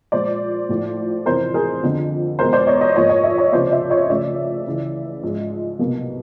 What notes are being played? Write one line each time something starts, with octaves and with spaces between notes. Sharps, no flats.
A#2 F3 G#3 C5 D5
A2 F3 A3
F2 C3 E3 A#4 C5
G#4 A#4
F2 D3 F3
E2 B2 G#3 A#4 C5
C5 D5
C#5 D#5
C#5 D#5
G#2 F3 A#3 C#5 D#5
C#5 D#5
D5 E5
C#5 D#5
C#2 C3 F3 A#3 C5 D5
D5 E5
C#5 D#5
C#2 C#3 F3 A3 D5 E5
C#2 C#3 E3
G#2 F3 G#3
C2 B2 F#3 A#3